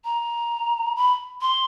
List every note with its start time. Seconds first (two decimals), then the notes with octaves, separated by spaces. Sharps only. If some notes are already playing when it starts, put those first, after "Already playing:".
0.05 A#5
0.96 B5
1.42 C6